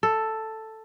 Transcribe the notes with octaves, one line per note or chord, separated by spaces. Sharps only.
A4